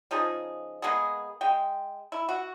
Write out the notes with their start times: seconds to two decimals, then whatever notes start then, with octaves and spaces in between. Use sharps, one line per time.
0.11 C#3 F3 D#4 G#4
0.82 G#3 A#3 B3 G#4
1.41 G#3 G5
2.12 E4
2.29 F#4